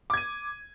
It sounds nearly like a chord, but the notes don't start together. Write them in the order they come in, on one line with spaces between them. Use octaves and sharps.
D6 G#6 D#7